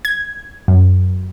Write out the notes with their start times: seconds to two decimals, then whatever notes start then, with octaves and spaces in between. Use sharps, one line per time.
0.05 G#6
0.68 F#2